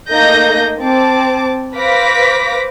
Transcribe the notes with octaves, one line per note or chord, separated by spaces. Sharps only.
A3 A#3 D#4 D#5 G6 A#6
C4 A5 D6
B4 C5 F5 D6 A#6 B6